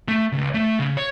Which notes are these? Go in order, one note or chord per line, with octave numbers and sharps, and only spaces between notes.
A3
C#2
A3
C#3
C#5